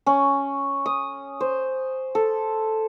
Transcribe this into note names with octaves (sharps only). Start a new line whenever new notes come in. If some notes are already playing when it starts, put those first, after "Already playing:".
C#4
D#6
C5
A4